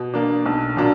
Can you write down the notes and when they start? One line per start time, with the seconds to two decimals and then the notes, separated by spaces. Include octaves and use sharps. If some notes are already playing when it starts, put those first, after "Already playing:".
Already playing: B2
0.14 A#3 D4
0.46 B1
0.76 A#2 F#3 A#3 D4